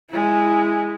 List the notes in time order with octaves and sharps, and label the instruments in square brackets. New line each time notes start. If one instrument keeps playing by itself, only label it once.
[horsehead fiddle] G#3 E4